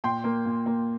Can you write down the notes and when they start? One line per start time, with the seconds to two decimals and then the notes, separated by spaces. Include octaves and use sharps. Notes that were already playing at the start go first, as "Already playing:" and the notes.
0.04 A#2 G5 C6
0.24 A#3
0.45 A#2
0.66 A#3